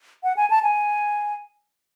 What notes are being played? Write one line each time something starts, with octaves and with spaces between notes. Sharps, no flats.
F#5
G#5
A5
G#5